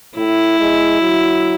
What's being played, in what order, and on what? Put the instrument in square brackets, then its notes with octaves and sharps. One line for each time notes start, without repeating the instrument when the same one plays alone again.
[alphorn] A2 [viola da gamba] E4
[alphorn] G#3
F#3